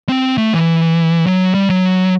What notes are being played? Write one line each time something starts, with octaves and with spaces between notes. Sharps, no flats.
C4
A3
E3
F#3
G3
F#3